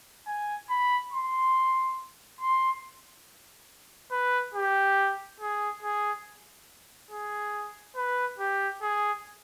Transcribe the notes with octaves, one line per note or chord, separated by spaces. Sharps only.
G#5
B5
C6
C6
B4
G4
G#4
G#4
G#4
B4
G4
G#4